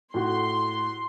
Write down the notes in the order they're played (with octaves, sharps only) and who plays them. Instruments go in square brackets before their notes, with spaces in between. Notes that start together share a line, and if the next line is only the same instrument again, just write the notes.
[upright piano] A2 F#4 [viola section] C6